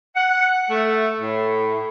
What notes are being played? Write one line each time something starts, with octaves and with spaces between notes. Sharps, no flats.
F#5
A3
A2